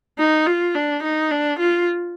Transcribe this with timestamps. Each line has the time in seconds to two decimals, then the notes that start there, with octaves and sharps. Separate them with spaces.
0.18 D#4
0.47 F4
0.75 D4
1.03 D#4
1.31 D4
1.59 F4